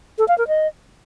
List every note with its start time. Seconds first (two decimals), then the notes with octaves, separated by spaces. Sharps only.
0.18 A4
0.28 F5
0.38 A#4
0.48 D#5